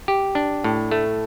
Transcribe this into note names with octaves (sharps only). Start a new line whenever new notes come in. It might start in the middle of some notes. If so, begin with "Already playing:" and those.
G4
D4
A2
A3